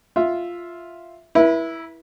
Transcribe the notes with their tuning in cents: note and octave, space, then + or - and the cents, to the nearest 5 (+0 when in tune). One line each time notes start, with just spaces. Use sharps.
F4 +0 E5 +0
E4 +0 B4 -40